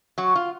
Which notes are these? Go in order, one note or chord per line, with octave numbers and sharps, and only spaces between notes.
F#3 F#4
F4